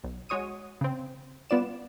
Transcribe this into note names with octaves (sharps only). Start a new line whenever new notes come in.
B1
G#3 F#4 C#5 D#6 D#7
C#3 C4
G3 B3 F4 D5 E7